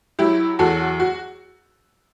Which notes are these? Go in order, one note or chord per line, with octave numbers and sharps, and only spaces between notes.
F#3 E4 G4
E2 F#4 A4
F#4